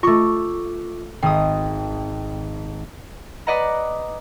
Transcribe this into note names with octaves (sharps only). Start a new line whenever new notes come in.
A3 F4 C#6 D6
G#1 G5 D#6
B4 D5 D#5 F#5 A#5